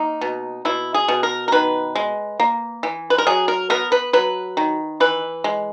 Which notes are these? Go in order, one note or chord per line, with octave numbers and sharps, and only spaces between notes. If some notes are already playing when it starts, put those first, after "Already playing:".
Already playing: A#3 D#4
B2
B2 E4
G#4
B2
A#4
A#4
D#3 B4
G#3
A#3
E3
B4
A#4
F#3 G#4
A#4
B3 A#4
B4
F#3 B4
D#3
E3 B4
G#3